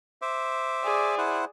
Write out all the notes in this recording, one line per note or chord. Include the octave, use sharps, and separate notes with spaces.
C5 E5 D6
G#4 D5
E4 C5 F#5